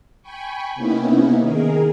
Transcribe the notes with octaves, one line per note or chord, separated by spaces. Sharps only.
G5 G#5 B5 C#6
C3 A#3 B3 C#4 D#4 E4
D#3 G#4 A#4